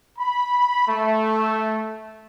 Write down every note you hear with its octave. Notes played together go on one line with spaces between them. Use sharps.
B5
A3